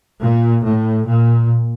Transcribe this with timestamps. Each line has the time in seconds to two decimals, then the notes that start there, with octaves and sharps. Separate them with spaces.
0.22 A#2
0.65 A2
1.08 A#2